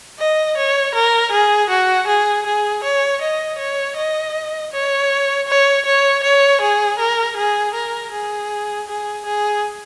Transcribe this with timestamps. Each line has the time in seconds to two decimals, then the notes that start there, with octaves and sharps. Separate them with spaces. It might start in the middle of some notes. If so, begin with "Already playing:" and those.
0.19 D#5
0.57 C#5
0.94 A#4
1.32 G#4
1.69 F#4
2.07 G#4
2.46 G#4
2.84 C#5
3.21 D#5
3.58 C#5
3.96 D#5
4.72 C#5
5.47 C#5
5.85 C#5
6.23 C#5
6.61 G#4
6.99 A#4
7.36 G#4
7.74 A#4
8.12 G#4
8.88 G#4
9.25 G#4